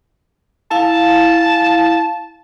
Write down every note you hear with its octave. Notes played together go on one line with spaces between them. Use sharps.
E4 F5 A5